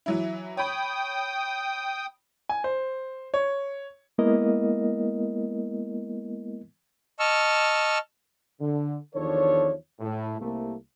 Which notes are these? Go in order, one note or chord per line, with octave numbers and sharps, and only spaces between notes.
E3 F#3 E4
C#5 G5 B5 D#6
G#5
C5
C#5
G#3 A#3 B3 E4 A#4 D#5
D#5 A5 C#6 E6 F6
D3
E2 D#3 F3 D4 A4 C#5
A2
C2 C3 A3 A#3